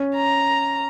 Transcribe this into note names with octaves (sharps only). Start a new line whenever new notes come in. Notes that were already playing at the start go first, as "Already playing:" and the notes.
Already playing: C#4
A#5